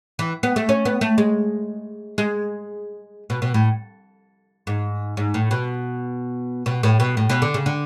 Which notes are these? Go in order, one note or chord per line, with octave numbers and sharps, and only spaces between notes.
E3
B3
A3
C#4
B3
A3
G#3
G#3
B2
B2
A2
G#2
G#2
A2
B2
B2
A2
B2
A2
B2
D3
C#3
D3